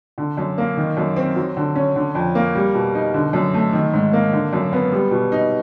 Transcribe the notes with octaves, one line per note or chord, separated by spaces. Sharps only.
D3
F#2
A#3
D#3
F#2
C4
F#3
D3
C#4
D3
F2
A#3
G3
B2
D#4
D3
F#2
A3
D#3
G#2
A#3
D3
F#2
B3
G3
B2
D#4